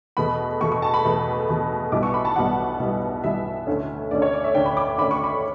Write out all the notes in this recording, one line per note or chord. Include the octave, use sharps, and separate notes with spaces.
E2 B2 A3 B5
E2 B2 A3 C#6
C#6
A5
B5
E2 B2 A3
E2 B2 A3
B1 B2 G3 B3 E4 D6
C#6
B5
A5
B1 B2 G3 B3 E4 F#5
B1 B2 G3 B3 E4
B1 B2 G3 B3 E4 E5
D2 D3 A3 C#4
D2 D3 A3 C#4 D5
C#5
D5
E5
D2 D3 A3 C#4 G5
B5
D6
D2 D3 A3 C#4 B5
C#6
B5